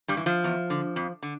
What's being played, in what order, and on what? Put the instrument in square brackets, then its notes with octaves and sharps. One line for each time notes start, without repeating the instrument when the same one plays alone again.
[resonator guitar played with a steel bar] G2 G3
E3
F3
E2
D3
F2
D3